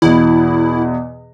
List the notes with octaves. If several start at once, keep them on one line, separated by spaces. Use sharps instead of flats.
E2 B2 E4